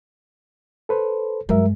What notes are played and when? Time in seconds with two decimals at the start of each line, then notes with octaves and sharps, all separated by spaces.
0.89 A4 B4 C5
1.49 G2 F#3 G#3 A#4 E5